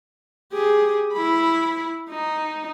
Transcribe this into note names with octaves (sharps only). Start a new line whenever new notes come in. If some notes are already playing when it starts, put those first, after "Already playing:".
G4 G#4
E4 B5
D#4